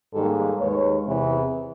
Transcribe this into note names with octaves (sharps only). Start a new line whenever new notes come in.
G#2 D#3 G3 A#3 G4 A4
D#2 D#3 G#3 B4 C#5
E2 C3 E3